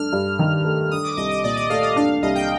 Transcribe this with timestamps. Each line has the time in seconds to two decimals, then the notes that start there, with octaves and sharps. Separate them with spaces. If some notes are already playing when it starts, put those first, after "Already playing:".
Already playing: G2 A3 D4 F6
0.13 G2
0.39 D#3
0.65 A3
0.91 D4 D#6
1.04 D6
1.17 C2 D#5
1.31 D#5
1.44 A#2 D5
1.57 D#5
1.70 A3 F5
1.83 D#5
1.96 D4 F5
2.22 C2 D#5
2.35 G5